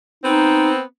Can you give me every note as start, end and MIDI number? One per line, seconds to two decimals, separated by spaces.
0.24 0.81 59
0.24 0.81 60
0.24 0.71 63